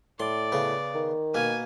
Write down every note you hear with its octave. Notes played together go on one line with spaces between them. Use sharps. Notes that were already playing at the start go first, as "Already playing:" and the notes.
A2 D5 C6
C#3 B3
D#3
B2 A#3 G#5